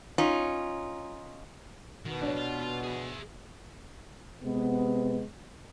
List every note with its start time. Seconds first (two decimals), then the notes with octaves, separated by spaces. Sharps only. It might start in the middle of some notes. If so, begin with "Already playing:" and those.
0.18 C#4 D#4 F4
2.05 B2 D#3
2.22 F2 A2 D4 C#5
2.36 F4
2.61 F4
2.84 G#4 E5
4.42 C3 G#3 B3